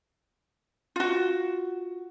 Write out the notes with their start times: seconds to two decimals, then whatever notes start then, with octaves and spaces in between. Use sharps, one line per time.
0.96 F4 F#4